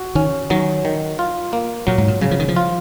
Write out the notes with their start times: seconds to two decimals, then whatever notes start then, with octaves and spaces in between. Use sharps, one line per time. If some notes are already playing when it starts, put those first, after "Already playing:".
Already playing: F#4
0.15 D#3 C#4
0.50 D#3 F#3
0.85 D#3
1.19 F4
1.53 A#3
1.87 A#2 F#3
1.98 G#2
2.08 A#2
2.21 C#3 F#3
2.31 F3
2.39 D#3
2.49 F3
2.56 F4